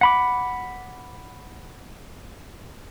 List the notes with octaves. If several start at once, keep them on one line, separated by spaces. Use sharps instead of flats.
F#5 B5 D6